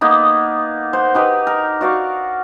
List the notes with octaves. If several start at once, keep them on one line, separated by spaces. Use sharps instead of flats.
A#3 B3 D#4
C5 F#5
D#4 G4 B4
A#4
F#4 D5 F5 C#6